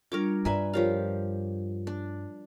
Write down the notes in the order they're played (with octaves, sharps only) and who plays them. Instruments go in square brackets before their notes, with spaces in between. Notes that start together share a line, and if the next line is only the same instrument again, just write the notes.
[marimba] G3 D4 F4 [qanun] A#4 C#5 D6
[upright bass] G2 [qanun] B4 E5 G#5 [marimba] D5 A#5
[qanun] F3 G4 F5 [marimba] A#4 C#5
[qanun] D4